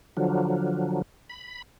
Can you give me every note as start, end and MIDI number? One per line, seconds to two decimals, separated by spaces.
0.17 1.02 50
0.17 1.02 53
0.17 1.02 54
1.29 1.62 83